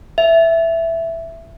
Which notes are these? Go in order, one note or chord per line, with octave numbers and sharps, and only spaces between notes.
E5